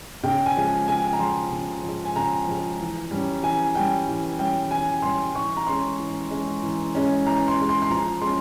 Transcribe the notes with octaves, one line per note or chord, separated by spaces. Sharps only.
C#3 G5
G#5
F3 G#3
C#3 G#5
A#5
F3 G#3 C6
C#3
F3 G#3
G#5
C#3 A#5
F3 G#3
E3
G3 C#4
E3 G#5
G3 C#4 G5
E3
G3 C#4 G5
E3 G#5
G3 C#4 C6
E3 C#6
A#5
G#3 C#4 C6
E3
G#3 C#4
E3
G#3 C#4
E3 A#5
C6
G#3 C#4
C6
C6
F3 A#5
G#3 C#4 C6